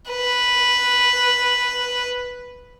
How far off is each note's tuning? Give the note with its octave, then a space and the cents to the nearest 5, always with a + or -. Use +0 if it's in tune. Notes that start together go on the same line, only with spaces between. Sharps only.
B4 -5